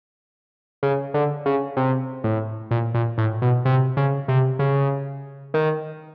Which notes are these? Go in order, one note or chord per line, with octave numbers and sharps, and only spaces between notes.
C#3
D3
C#3
C3
A2
A#2
A#2
A2
B2
C3
C#3
C3
C#3
D#3